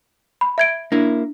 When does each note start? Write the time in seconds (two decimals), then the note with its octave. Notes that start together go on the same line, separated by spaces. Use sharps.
0.41 B5
0.58 E5 G#6 D7
0.92 A#3 D4 E4